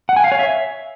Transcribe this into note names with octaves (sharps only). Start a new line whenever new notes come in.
F#5
G#5
F5
C#5
E5